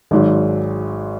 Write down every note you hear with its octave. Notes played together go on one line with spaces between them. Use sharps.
G#1 G#2 F#3